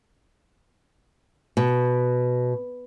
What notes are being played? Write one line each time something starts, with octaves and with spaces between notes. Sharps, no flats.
B2